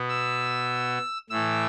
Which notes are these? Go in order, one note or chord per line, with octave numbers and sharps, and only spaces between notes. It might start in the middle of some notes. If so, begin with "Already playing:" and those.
Already playing: B2 B3
E6
A2 E3 A3 E6